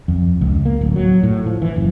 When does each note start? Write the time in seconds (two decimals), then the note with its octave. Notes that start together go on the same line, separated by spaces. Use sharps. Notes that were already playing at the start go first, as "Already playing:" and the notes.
0.08 F2
0.41 C#2
0.65 A#3
0.81 D1
0.96 F#3
1.23 A2
1.46 F3
1.62 E3
1.76 F#1